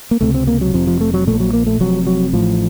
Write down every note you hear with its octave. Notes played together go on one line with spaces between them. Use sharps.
A#3
C#2 C3 A3
C4
A#3
F#3
F1 F2 C3 F3
F3
A3
F#3
A#1 A#2 A3
F#3
A#3
A3
F1 F2 C3 F#3
F#3
A1 A2 F3